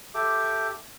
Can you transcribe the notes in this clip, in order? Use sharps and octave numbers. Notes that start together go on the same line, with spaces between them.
G4 A4 E5 D6